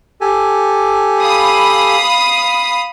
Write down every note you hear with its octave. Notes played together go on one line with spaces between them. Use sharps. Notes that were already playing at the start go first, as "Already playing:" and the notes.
G4 A4 G#5
F5 B5 D#6